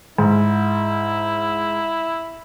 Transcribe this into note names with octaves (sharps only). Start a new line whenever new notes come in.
G#2 E4